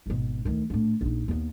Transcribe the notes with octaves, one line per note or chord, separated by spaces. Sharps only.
G#1 B2
D2 D#3
A2 D3
A#1 D#4
D#2 B3